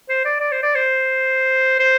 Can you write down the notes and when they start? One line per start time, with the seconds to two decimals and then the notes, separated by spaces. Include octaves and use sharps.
0.09 C5
0.25 D5
0.40 D5
0.51 C5
0.63 D5
0.75 C5
1.79 C5